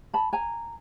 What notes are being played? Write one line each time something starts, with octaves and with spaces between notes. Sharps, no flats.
A5 B5
G#5 A#5